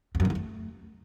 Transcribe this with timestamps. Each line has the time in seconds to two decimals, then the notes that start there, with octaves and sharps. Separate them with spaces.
0.15 F2
0.20 F#2
0.25 C#3
0.30 E3
0.35 A3